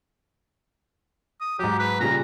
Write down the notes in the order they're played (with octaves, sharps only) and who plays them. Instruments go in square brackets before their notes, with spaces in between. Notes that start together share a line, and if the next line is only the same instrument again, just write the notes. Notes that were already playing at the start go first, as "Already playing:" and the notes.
[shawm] D#6
[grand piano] G#2 F#3 [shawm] G4
[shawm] B4
[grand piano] A#2 C#3 G3 [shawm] A#5